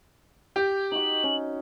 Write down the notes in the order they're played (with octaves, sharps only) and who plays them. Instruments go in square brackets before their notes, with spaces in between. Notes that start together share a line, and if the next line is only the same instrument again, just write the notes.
[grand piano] G4 [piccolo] G6
[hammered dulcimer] D#4 F#4 [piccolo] F#7
[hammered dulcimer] C#4